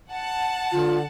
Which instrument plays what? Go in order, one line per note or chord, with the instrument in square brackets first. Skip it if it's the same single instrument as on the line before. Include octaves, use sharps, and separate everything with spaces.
[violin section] F#5 A5
[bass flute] D3 [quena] F4